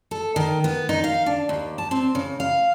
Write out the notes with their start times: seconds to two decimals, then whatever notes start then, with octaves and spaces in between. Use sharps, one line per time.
0.11 A4
0.36 D#3
0.64 B3
0.89 D#4
1.04 F5
1.26 D4
1.49 D#2
1.78 A5
1.91 C4
2.15 C#3
2.40 F5